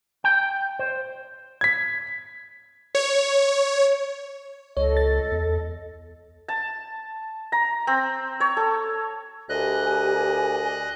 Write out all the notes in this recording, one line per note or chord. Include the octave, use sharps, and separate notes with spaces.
G5
C5
G#6 B6
C#5
C#2 A4 C#5 D#5
A6
E2
A5
A#5
C4
C#5
A4
D2 G4 A#4 D#5 G#5 F#6